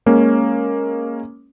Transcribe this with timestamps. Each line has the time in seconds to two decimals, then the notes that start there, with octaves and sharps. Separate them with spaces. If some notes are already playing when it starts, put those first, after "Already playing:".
0.06 G#3 A#3 C#4